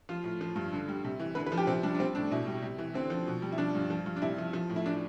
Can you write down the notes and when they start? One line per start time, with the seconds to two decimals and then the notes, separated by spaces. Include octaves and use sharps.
0.09 F3 F4
0.24 A2
0.41 F3
0.56 G2
0.73 D3
0.88 G3
1.04 C3
1.20 E3
1.35 D3 B4
1.46 B4
1.52 F3
1.57 G4
1.67 C3 C4
1.83 G3 D4
1.95 D4
1.99 G3 C4
2.15 A2 D4
2.31 B2 E4
2.47 G3
2.62 C3
2.78 E3
2.94 D3 C4
3.10 F3
3.27 B2
3.42 G3
3.52 E4
3.58 F3 D4
3.75 G2
3.90 F3
4.06 G2
4.16 D4
4.22 C3 E4
4.38 F3
4.53 F3
4.70 A2
4.76 E4
4.86 E3 D4